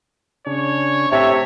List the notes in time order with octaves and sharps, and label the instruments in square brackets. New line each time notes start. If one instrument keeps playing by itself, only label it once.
[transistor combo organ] C#3 D4 [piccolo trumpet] C#5
[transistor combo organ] A2 A5 [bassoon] C3 [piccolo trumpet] C#5 [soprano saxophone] E5